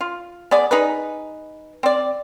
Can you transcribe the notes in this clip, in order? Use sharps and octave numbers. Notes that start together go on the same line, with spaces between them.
F4
B3 G#4 D5
D#4 G#4 B4
C4 D5